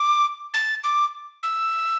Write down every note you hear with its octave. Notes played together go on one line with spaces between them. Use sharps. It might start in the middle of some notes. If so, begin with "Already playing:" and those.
Already playing: D6
A6
D6
E6